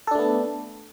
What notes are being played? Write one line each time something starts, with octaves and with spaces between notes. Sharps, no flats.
A3 B3 D4 A4